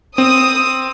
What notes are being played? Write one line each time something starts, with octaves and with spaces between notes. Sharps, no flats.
C4 D#6